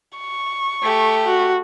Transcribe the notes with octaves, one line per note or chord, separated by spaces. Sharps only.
C#6
A3 G4
F#4